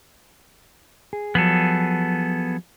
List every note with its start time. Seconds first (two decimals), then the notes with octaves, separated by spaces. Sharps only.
1.13 G#4
1.35 F3 F#3 B3 G#4 A4